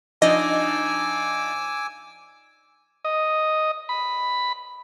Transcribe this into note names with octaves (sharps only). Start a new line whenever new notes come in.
F3 D4 D#4 D#5 G#5 D6 E6
D#5
B5